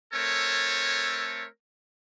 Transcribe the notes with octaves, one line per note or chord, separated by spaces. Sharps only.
A3 C4 A4 A#4 C#5 G#5